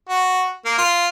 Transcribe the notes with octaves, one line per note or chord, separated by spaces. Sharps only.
F#4
A#3
F4